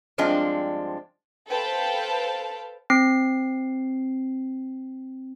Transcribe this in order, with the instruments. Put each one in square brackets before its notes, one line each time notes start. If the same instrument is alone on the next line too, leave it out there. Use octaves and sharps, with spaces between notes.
[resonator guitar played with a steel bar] G2 F3 G#3 C4 D4
[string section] A4 B4 C5 F5 G5 A5
[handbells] C4 C7